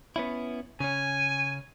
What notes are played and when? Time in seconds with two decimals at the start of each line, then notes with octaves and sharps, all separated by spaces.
0.16 B3 C#4 E4
0.80 C#3 C#4 G#5